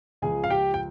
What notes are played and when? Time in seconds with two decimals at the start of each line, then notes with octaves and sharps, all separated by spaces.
0.22 C#2 C#3 F3 G#4 G#5
0.44 F5
0.50 G4 G5
0.74 G5